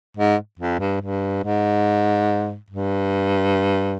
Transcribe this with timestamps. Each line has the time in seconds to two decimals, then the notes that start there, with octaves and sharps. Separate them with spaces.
0.17 G#2
0.59 F2
0.80 G2
1.01 G2
1.43 G#2
2.70 G2